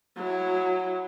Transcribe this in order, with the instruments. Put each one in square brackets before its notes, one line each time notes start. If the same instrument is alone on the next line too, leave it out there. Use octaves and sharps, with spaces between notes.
[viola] F#3 E4